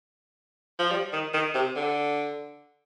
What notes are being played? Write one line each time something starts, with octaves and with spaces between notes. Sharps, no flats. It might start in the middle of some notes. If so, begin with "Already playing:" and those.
F3
G3
D#3
D#3
C3
D3